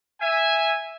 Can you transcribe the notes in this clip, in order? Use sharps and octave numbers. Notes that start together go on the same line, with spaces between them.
E5 G#5